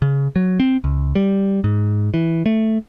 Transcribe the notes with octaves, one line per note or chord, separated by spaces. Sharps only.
C#3
F#3
C4
C#2
G3
G#2
E3
A3